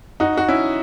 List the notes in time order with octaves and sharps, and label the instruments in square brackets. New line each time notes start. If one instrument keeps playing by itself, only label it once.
[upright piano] D#4 F#4
F#4
C#4 E4